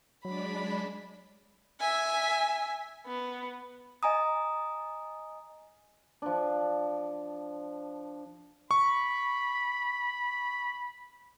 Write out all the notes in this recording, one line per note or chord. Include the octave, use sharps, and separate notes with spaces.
F#3 G#3 D4 D5 B5
E5 G#5
B3
D#5 G#5 A#5 D#6
F3 D4
B5 C#6